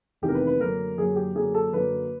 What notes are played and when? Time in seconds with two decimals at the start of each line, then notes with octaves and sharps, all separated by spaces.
0.22 F1 E2 C3 D#3 G4
0.28 A#4
0.34 B4
0.47 B4
0.60 F#2 D3 F#3 A#3 A#4
0.97 F#2 D3 F#3 A#3 G#4
1.16 G4
1.35 F#2 D3 F#3 A#3 G#4
1.54 A4
1.73 F#2 D3 F#3 A#3 B4